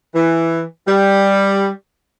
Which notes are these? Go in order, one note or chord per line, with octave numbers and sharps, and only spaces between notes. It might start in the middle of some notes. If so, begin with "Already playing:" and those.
E3
G3